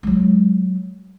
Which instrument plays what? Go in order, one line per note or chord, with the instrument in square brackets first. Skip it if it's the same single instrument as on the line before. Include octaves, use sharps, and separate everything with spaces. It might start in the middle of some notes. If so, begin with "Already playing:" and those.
[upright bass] F#3 G#3